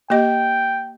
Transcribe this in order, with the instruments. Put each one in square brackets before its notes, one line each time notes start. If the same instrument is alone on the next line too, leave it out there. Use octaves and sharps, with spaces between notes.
[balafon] A#3 G4 D#5 [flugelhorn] G5